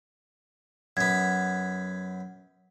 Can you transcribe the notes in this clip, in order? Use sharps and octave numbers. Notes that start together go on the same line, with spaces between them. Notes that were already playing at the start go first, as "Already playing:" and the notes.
F#2 B3 G#6